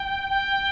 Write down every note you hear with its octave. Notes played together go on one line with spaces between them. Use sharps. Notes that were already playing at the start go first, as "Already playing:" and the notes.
Already playing: G5
G5